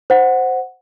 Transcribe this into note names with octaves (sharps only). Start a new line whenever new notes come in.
C5 F#5